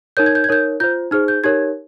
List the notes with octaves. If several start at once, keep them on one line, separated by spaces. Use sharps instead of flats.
D#4 A#4 C#5 G6
G#6
G6
G#6
D#4 A#4 C#5 G6
F4 C5 G6
D#4 G#4 C5 F6
G6
D#4 G4 A#4 C#5 G#6